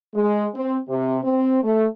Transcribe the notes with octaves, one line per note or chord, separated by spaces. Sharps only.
G#3
C4
C3
C4
A3